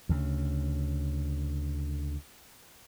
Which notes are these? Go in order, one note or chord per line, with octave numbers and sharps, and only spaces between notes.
D2 C#3